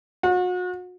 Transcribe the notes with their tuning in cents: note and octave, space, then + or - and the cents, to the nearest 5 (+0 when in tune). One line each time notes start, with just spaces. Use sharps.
F#4 -35